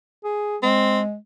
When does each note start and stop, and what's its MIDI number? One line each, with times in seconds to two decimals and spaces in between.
0.24 0.57 68
0.63 1.16 56
0.63 1.01 60